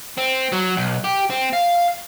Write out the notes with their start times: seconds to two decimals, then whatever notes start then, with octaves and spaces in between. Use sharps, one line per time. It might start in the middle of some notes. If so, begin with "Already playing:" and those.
0.17 C4
0.52 F#3
0.77 B1
1.04 G4
1.30 C4
1.53 F5